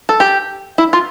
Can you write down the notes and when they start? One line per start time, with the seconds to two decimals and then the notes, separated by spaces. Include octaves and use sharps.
0.09 A4
0.20 G4
0.78 E4
0.93 F4